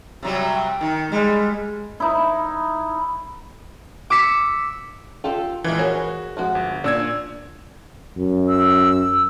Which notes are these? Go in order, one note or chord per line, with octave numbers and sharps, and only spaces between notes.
C3 F#3 G3
G5
D#3
G3 G#3
D#4 E4
D6 E6 B6 C#7
F4 G4 A4
A#1 E3 G#3 F4
F#4 G#4 A#4 C#5
F3 G#3 F#4
G1
A#2 D4 E6 G#6
F#2
E6